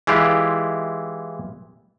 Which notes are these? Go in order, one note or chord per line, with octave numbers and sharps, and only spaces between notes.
E3 G#3 E4 F4 G4